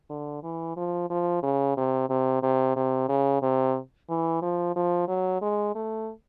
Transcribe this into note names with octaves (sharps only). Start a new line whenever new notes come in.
D3
E3
F3
F3
C#3
C3
C3
C3
C3
C#3
C3
E3
F3
F3
F#3
G#3
A3